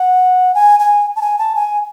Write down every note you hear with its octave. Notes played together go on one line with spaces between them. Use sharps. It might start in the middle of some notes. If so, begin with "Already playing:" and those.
Already playing: F#5
G#5
G#5
A5
G#5
A5
G#5